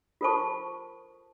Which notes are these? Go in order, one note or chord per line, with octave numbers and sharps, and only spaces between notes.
F4 A4 A#4 C5 A5 C#6